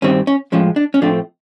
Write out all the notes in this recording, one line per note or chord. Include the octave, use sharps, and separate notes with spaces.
G2 D#3 G3 C4 C#4
C#4
A2 F3 G#3 C#4
D4
C#4
A2 F3 A3 C4 D4